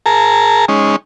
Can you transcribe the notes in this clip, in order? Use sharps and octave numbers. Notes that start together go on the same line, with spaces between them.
G#4 A#4 A5 A#5
G#3 C#4 D#4